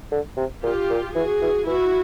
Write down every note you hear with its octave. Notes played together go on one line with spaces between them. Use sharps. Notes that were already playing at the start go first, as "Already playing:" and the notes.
D3
C3
A#2 F4 G4
A#2
E3 F#4 G#4
E3
E3 E4 F#4